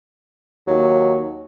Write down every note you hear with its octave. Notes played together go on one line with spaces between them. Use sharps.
D#2 F#3